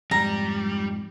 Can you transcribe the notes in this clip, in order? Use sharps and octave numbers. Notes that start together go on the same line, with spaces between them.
F2 G#2 G3 A#5